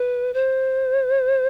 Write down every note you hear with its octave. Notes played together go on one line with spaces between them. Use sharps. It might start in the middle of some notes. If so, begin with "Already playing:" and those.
Already playing: B4
C5